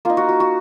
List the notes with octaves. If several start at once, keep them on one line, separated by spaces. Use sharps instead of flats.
A#3 D#4 F4
F#4
F#4
F#4